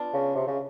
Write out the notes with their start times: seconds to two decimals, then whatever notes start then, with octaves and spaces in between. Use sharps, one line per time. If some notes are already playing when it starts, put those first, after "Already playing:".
Already playing: B3 D4 F4
0.14 C#3
0.36 C3
0.47 C#3